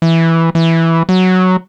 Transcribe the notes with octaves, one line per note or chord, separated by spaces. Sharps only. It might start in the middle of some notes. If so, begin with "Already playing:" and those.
E3
E3
F#3